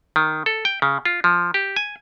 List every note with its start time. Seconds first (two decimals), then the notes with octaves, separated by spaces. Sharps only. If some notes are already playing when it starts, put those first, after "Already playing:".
0.16 D#3
0.46 A4
0.65 G5
0.82 C#3
1.05 F4
1.24 F3
1.54 G4
1.76 G#5